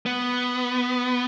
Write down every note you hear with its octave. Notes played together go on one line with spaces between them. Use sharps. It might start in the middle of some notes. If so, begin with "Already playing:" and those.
B3